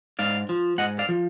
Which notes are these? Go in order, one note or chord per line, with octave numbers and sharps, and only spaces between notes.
G#2 D5 F5
F3
G#2 D#5 F#5
D5 F5
F3